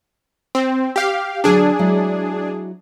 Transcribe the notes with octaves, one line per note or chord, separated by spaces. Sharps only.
C4
G4 F5
D3 F#3 D4 G#4 A4
F#3 G#3 E4